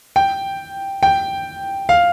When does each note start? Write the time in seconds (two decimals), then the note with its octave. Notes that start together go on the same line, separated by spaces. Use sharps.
0.16 G5
1.03 G5
1.89 F5